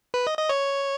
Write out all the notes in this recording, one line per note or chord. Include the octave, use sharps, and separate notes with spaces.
B4
D#5
D#5
C#5